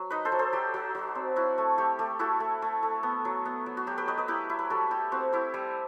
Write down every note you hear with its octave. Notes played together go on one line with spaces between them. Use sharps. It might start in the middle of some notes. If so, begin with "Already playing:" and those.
Already playing: F#3
D#4 B4 D#5
A4 C5
F#3
A4 C5
F#3 G4
F#3
F#3
C4
E4 F#4
A3
A3 G4
A3 G4
E4 F#4 A4
A3
A3
A3
B3
F#3
B3
F#3
F#4
F#3 G4
G4 B4
F#3 B4 D#5
B4 D#5
E4 G4 B4
E4
B4
G3 F#4 A4
G3 G4
C4 F#4
E4 G4
G3